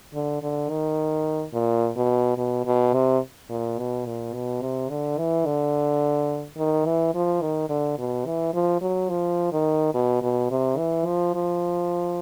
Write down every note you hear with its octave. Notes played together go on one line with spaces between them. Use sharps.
D3
D3
D#3
A#2
B2
B2
B2
C3
A#2
B2
A#2
B2
C3
D3
E3
D3
D#3
E3
F3
D#3
D3
B2
E3
F3
F#3
F3
D#3
B2
B2
C3
E3
F3
F3